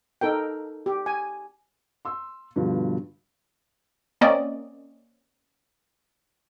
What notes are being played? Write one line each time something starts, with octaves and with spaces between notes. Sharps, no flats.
D#4 A4 A#4 G5
G4
G#5
C6 E6
G2 B2 D3 F3
A#3 C4 C#4 D5 D#5